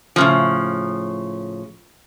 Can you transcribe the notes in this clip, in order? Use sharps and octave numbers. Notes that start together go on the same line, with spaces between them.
A2 C#3 F3